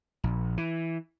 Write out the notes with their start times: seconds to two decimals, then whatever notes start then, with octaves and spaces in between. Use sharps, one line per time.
0.24 A#1
0.57 E3